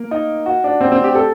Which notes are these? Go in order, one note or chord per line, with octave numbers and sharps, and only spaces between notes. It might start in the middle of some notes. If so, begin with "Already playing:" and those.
Already playing: A#3
D#4
F#4
D4
C4
C4
G4
A4